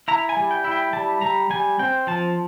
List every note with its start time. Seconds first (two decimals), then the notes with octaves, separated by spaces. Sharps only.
0.08 E4 A#5
0.29 G#5
0.37 G3
0.51 G5
0.64 E4
0.72 G5
0.93 G3 A5
1.21 G3 A#5
1.50 G3 G#5
1.79 C4 G5
2.07 F3 A5